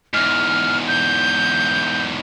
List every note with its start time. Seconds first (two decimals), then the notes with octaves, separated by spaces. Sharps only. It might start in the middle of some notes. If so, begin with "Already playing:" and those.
0.14 E2 G#2 F6
0.87 G6